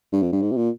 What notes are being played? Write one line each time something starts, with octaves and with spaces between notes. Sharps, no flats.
G2
F2
G2
G#2
C3
A#2